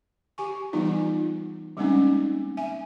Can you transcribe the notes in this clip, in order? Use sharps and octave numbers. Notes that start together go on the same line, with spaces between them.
G4 G#5 C#6
E3 G3 B3 D#4 F4
G3 G#3 A#3 C4 C#4 D#4
E5 G#5